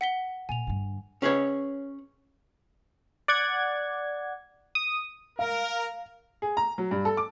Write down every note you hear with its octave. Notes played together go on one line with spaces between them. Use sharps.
F#5 B6 G7
A#2 G#5 F7
G2 D3
C#4 G#4 B4 C#5
D5 F#5 G#6
D#6
A#4 F5
G#4
A#5
F#3
G2
A4
D6